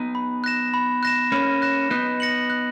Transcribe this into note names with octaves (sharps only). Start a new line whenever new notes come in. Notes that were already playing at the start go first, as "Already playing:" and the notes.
Already playing: B3 D#4
B5
F#6 A#6 E7
B5
F#6 A#6 E7
A#3 C#4 B5
F#6 A#6 E7
B3 D#4 F#6
A#6 C#7 F#7
F#6